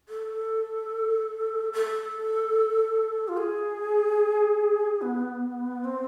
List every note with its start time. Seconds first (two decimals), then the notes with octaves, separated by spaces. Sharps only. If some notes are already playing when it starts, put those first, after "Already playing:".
0.09 A4
1.73 A4
3.28 F4
3.37 G#4
5.02 B3
5.84 C4